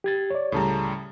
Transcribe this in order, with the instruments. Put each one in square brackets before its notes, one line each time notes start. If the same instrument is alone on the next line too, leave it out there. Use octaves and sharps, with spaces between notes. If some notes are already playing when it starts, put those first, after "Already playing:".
[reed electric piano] G4 G#6 A6
C#5 D5
[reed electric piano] C#2 A5 A#5 [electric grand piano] A2 C#3 G3